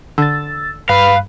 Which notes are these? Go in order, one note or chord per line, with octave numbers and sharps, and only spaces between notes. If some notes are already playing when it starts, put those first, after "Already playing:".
D3 E6 A6
G2 B4 F5